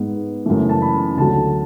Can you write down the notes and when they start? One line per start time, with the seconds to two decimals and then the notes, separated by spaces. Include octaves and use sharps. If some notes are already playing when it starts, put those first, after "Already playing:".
Already playing: G#2 G#3 B3
0.46 F#2 C#3 E3 A3
0.69 A5
0.82 B5
1.17 D2 D3 F#3 A5